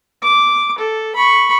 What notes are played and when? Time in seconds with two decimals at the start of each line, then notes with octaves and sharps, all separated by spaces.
0.23 D6
0.78 A4
1.15 B5 C#6